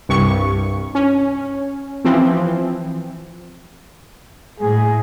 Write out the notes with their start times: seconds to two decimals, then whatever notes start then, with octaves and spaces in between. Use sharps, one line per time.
0.09 C2 G2 C#6
0.95 C#4
2.05 E3 F3 C4
4.60 A2 G#4